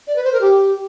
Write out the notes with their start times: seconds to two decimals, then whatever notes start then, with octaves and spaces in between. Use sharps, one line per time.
0.07 D5
0.16 B4
0.24 C5
0.32 A#4
0.41 G4